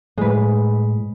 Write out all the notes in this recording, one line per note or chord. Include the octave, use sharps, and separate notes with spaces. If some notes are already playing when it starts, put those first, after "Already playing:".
A2 G#3 B4